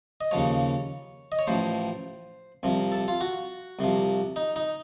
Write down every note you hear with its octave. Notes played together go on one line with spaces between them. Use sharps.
D#5
D#2 C#3 F3 C#5
D#5
C#5
A1 A2 F3 C5
C2 C3 F3
A4
F4
F#4
C2 C3 F3
D#4
D#4